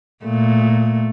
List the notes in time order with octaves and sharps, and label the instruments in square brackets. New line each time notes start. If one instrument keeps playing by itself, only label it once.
[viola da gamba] A#2 A3